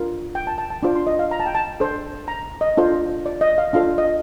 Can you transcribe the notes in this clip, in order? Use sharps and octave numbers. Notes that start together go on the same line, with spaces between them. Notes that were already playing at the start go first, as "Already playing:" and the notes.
Already playing: D4 F4 A#4
G5
A5
A5
A5
D4 F4 C5 D6
C6
D#5
F5
A#5
A5
G5
A5
D4 A4 C5
A#5
D#5
D4 F4 A4 C5
D5
D#5
F5
D4 F4 A4 C5 F5
D#5